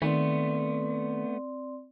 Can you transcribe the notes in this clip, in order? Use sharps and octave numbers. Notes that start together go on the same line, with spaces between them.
D#3 A3 B3 C4 D5 C6